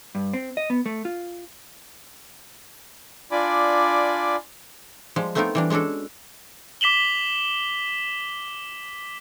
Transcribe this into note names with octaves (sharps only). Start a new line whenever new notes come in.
G2
C4
D#5
B3
A3
F4
D4 F4 D5 G#5 B5 D6
F3 G3 G#3
A3 B3 C4 D#4 F4 A#4
E3 G3 D4
G#3 C#4 D4 F#4 A4
D6 B6 E7 F#7 G7